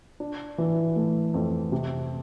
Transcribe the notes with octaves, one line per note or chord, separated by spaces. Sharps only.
D4
E3
A3
F2
C3